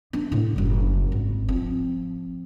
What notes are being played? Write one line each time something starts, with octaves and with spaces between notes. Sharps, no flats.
B3 D4
A2 D3
F#1 G3
G#1
F3 C4